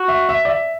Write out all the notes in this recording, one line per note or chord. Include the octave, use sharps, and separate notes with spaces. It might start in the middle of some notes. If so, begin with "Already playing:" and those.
Already playing: F#4
E5
E5
D5
E5